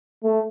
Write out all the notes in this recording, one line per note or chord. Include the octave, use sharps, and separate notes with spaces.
A3